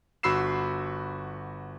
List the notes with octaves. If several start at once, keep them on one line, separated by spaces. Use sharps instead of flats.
G1 F#4 B5 E6 C7 E7